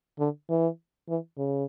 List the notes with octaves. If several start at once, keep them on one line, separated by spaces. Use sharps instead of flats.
D3
E3
E3
C#3